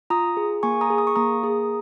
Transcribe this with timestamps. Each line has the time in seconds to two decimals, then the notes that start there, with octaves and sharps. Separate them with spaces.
0.10 F4 A#5 D#6
0.37 G#4
0.63 A#3 G#5 C#6
0.81 A#5 D#6
0.90 G#4
0.98 D#6
1.07 C#6
1.16 A#3 A#5 D#6
1.43 G#4